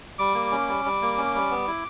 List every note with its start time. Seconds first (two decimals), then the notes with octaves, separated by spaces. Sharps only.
0.19 G3 D6
0.35 A#3
0.52 C#4
0.68 G3
0.85 G3
1.02 A#3
1.18 C#4
1.34 G3
1.50 B3
1.67 E4